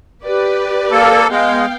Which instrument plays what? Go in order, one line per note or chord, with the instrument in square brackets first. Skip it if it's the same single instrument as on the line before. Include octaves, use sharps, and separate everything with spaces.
[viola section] G4 B4 D5
[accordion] A#3 A4
[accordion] G#3 [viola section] B3 F5 G5